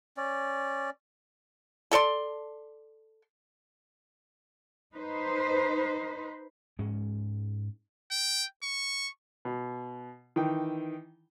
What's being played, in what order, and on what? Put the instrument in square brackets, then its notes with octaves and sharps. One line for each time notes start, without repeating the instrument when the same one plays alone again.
[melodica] C#4 D5
[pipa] A3 A4 D5 C6
[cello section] D#4 B4 C5
[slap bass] G#2 G#3 C#4
[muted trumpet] G5
C#6
[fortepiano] B2
D#3 E3 G5